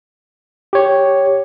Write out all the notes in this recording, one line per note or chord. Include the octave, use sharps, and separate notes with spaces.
G4 C#5